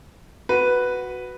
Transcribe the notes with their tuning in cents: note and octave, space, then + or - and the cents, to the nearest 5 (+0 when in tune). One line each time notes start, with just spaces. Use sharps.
F#4 +0 B4 +0